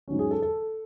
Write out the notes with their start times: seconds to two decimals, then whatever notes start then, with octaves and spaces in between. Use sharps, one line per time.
0.08 G#2 F#3 C#4
0.19 G#4
0.31 A4
0.42 A4